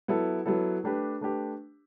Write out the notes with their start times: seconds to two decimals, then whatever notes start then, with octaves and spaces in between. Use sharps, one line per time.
0.08 F#3 B3 E4 A4
0.46 F#3 B3 E4 A4
0.84 A3 D4 G4 B4
1.21 A3 D4 G4 B4